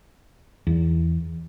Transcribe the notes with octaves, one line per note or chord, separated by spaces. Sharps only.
E2